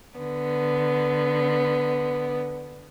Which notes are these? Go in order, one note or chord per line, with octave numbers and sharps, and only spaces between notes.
D3 B3